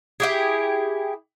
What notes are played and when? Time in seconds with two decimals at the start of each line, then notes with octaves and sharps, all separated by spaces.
0.20 E4 G4 G#4